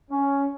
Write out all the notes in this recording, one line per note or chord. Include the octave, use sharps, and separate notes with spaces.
C#4